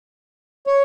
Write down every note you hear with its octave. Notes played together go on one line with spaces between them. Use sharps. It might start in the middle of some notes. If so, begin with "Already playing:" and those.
C#5